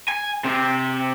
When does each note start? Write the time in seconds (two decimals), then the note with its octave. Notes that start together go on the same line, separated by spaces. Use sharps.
0.08 G#5
0.44 C3 C4